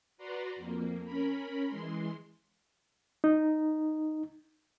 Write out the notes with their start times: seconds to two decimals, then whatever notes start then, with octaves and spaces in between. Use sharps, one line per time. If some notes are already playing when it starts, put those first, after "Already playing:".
0.18 F#4 B4 D5 A#5 C6
0.56 F2 A#3
1.04 C#4 A#4 B5
1.68 E3 G#3 C6
3.24 D#4